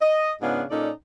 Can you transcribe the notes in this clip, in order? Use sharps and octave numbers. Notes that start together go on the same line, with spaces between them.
D#5
G#2 C#3 B3 D4 F4 F5
A#2 C#4 D#4 A4 D5